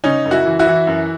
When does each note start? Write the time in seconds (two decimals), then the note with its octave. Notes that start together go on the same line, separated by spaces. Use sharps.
0.04 C#3 C#4 D#4
0.25 F#2
0.31 E4 F#4
0.46 E3
0.59 E4 F#4
0.67 E3
0.87 F#2